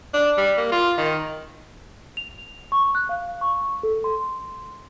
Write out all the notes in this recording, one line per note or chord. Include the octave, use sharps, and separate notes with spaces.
D4
G3
A#3
F4
D#3
F7
C#6
F#6
F5
C#6
A4
C6